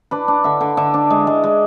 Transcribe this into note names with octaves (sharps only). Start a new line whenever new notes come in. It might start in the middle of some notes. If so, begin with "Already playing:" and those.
D4 B4
D4
D3 E5
D3
D3 E5
D4
G#3
G#3
G#3